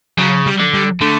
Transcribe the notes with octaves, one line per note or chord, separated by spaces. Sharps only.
C#3 F#3
G3
D3
G3
D3 A3